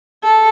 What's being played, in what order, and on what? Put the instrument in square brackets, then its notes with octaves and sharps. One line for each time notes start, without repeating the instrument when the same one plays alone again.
[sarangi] A4